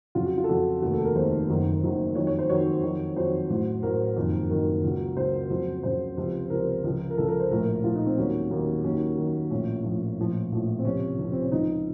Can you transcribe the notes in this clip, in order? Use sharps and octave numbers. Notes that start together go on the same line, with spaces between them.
F2 C#3 F#3 F4
F#4
F4
A4
F2 C#3 F#3 F#4
F1 D#2 D#3 F#4
A4
A#4
F1 D#2 D#3 C5
F#1 F#2 D#3 F#3
F#1 F#2 D#3 F#3
F2 D#3 F#3 C#5
C#5
C5
F2 D#3 F#3 C#5
F2 D#3 F#3
F2 D#3 F#3 C5
A1 A2 F#3
A1 A2 F#3 A#4
F#1 F2 D#3 F#3
F#1 F2 D#3 F#3 A#4
C#2 C#3 F#3
C#2 C#3 F#3 C5
F2 C#3 F#3
F2 C#3 F#3 C5
C#2 C3 F3
C#2 C3 F3 A#4
C#2 C#3 F3
A#4
C#2 C#3 F3 A4
A#4
C5
A#1 A2 F3 A#4
A#1 A2 F3 F4
D#4
C4
D#2 D#3 F#3 C#4
D#2 D#3 F#3
D#2 D#3 F#3 C#4
D#2 D#3 F#3
A#1 A2 F3 C#4
A#1 A2 F3
A#1 A2 F3
A#1 A2 F3
C4
C#2 C3 F3 C#4
C#2 C3 F3
C4
C#4
C#2 C#3 F3 D#4